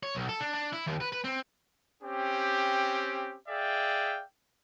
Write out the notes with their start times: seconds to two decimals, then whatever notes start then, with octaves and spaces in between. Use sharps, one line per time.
0.03 C#5
0.15 B1
0.29 A4
0.40 D4
0.54 D4
0.73 E4
0.87 D#2
1.01 B4
1.12 B4
1.24 C4
2.03 C4 C#4 G4
3.48 G#4 D5 E5 F5 G5